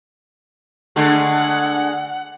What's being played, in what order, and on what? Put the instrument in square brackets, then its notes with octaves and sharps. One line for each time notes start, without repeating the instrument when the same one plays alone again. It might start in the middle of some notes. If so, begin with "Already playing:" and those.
[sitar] D3 G#3 A3 [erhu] F#5